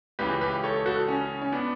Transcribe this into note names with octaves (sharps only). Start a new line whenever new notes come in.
C#2 C#3 E3 G4 B4
G4 B4
A4 C#5
F#4 A4
C#4
C#4
B3 D4